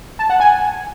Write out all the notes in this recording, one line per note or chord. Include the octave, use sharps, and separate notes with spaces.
A5
F#5
G#5